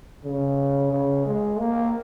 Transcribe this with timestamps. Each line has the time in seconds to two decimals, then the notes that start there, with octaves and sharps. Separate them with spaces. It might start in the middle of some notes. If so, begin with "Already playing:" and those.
0.24 C#3
0.92 C#3
1.26 G#3
1.59 A#3